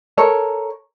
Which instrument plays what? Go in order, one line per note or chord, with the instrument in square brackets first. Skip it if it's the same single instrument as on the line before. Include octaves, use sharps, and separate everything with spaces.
[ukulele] A4 A#4 C#5